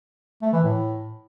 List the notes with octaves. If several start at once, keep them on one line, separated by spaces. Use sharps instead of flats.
A3
E3
A2